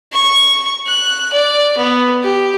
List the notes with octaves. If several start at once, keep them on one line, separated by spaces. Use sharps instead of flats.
C#6
F#6
D5
B3
G4